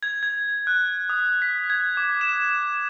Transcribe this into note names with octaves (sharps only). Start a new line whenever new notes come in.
G#6
G#6
F#6
D#6
B6
G#6
D6
E7